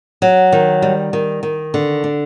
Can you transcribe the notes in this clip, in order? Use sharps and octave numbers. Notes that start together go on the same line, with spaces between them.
F#3
D#3
G3
D#3
D#3
D3
D4